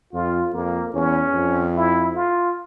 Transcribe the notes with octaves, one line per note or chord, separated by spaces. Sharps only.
F2 F4
F2 A#3
E2 C#4
F2
E4
F4